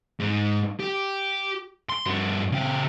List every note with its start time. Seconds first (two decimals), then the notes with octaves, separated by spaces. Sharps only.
0.20 G#2
0.80 G4
1.90 C6
2.06 G2 F#4
2.51 C#3 G4